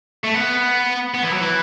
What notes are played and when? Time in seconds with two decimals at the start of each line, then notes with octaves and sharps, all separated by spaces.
0.24 A3
0.35 B3
1.14 B3
1.23 E3
1.32 F#3
1.40 E3